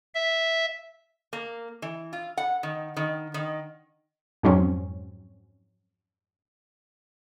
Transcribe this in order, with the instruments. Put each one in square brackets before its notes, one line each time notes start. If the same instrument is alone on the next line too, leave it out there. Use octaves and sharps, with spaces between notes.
[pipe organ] E5
[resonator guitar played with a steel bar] A#3
E3
F4
F#5
D#3
D#3
D#3
[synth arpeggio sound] F2 G#2 F#3 C4 C#4